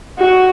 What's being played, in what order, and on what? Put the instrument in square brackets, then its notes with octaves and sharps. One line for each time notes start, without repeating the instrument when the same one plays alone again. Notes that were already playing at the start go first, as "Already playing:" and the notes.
[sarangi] F#4